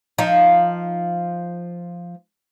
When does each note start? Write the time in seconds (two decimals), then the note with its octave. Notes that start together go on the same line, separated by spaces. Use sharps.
0.18 F3 D#4